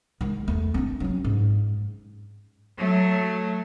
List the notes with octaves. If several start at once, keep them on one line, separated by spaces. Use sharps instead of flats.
D#3 G#3
E2 A3
C4 D4
F#3 C#4
G#2
F#3 A3